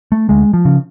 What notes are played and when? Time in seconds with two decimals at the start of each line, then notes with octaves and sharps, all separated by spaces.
0.12 A3
0.29 D2 G#3
0.54 F3
0.65 C#3